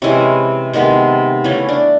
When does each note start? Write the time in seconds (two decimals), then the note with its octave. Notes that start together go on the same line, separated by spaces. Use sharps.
0.02 C3 E3 G#3 C#4
0.73 C3 D#3 G#3 B3
1.44 C#3 E3 A3 C#4
1.69 D4